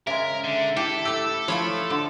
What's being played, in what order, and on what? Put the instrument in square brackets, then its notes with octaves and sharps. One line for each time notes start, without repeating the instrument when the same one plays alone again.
[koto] C#3 G#3 [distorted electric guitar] A#4 [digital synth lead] E5
[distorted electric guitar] D3
[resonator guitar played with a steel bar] E4 [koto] G4 [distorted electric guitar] A4
[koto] A3 G4 [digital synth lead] E6
[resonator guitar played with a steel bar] F3 A3 E4 [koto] C#5 [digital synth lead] B5
[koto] D3